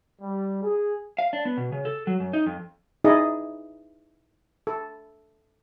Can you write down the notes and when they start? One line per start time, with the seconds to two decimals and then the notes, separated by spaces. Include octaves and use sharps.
0.22 G3
0.63 G#4
1.19 F5
1.33 D4
1.45 B3
1.57 B2
1.72 C#3
1.85 A4
2.07 F#3
2.20 F#2
2.33 D#4
2.46 F2
3.04 D#4 E4 G#4 D5 D#5
4.67 A4